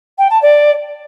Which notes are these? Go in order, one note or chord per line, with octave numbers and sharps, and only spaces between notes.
G5
A5
D5